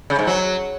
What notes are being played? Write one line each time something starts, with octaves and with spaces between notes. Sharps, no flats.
C#3
G#2
F#3